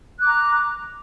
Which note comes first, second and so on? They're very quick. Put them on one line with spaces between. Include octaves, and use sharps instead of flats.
F#6 D6 A#5